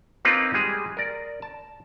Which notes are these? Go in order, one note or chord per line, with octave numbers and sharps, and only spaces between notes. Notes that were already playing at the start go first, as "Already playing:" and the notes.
A#3 C4 D#4 F4 B4
G3 G#3 G#4
A#4 D5
A5